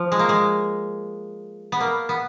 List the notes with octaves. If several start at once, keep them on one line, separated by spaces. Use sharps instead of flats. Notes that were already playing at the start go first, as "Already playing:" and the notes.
Already playing: F3
G#3
A#3
G#3
B3
A#3
B3